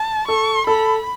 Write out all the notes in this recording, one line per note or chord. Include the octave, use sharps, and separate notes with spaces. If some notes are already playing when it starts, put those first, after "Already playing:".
Already playing: A5
A4 C#6
A4 B5